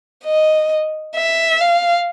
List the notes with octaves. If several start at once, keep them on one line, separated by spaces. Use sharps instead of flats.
D#5
E5
F5